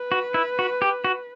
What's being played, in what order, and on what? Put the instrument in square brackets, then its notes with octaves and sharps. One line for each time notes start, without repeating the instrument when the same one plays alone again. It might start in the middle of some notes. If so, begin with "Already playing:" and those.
Already playing: [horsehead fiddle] B4
[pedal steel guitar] F#4
E4
F#4
G4
F#4